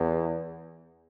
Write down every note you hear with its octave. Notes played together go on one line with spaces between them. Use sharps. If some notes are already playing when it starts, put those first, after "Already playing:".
Already playing: E2